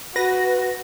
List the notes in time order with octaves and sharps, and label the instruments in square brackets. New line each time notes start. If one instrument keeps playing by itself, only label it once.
[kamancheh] F#4 [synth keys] B4 A#6